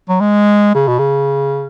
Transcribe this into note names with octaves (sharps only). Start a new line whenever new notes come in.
F#3
G#3
C#3
B2
C#3